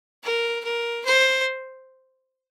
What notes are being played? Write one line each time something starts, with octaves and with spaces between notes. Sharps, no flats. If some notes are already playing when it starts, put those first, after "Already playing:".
A#4
A#4
C5